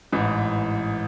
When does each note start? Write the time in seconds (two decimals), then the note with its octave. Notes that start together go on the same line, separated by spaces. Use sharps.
0.13 A1 G#2 E3